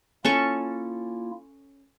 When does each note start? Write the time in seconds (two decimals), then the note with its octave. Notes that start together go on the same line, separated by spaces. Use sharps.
0.25 A#3 C#4 E4 F4 A4 C#6